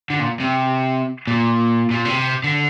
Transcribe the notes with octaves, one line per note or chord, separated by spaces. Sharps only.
D3
A#2
C3
A#2
A#2
C3
D3